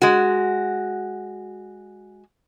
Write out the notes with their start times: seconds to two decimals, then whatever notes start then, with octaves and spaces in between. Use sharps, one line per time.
0.02 G#3 F#4